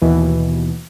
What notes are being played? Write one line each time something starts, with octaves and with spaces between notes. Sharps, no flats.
D#2 B2 E3